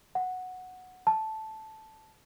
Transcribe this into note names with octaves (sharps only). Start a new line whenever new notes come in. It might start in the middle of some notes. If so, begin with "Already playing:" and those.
F#5
A5